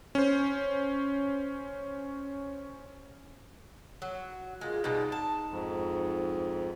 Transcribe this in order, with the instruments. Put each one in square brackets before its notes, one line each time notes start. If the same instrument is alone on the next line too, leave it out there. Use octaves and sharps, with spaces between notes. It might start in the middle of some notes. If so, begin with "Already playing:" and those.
[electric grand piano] C#4 C5
[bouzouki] F#3
[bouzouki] A#2 G#3 [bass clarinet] F4
[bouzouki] B2 G3 G#3 [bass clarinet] D#4
[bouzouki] A5
[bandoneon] F2 G#2